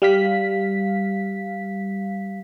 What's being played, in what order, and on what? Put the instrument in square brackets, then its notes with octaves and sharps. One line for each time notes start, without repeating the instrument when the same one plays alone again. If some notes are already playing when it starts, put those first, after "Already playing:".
[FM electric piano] G3 F5 B6